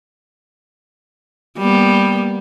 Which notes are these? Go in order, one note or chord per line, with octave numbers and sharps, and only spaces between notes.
G3 A#3 B3